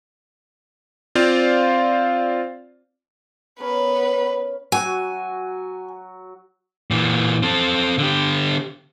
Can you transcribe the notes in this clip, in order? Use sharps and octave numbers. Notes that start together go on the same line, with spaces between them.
C4 F4 C5 D5 F5
B3 C#4 A#4 B4 C#5
F#3 F#4 G#5
A#2 E3
C4 A4
D3 G4